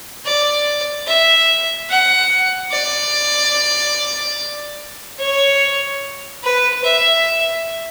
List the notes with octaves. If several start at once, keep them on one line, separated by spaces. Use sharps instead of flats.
D5
E5
F#5
D5
C#5
B4
E5